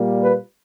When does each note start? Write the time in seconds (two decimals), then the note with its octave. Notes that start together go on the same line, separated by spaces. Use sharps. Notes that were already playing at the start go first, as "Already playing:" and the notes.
Already playing: A#2 G3 A#3
0.22 B4